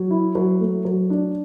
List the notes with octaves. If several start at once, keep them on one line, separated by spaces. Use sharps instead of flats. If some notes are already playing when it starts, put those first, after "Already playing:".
Already playing: F#3
E4
F#3
A3
F#3
D4